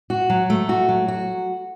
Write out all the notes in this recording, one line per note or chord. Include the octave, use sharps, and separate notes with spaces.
F#4
F#3
A3
F#4
F#3
F#4